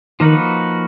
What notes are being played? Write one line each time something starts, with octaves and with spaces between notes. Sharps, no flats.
D#3 F3 A#3 D#4 F#4 B4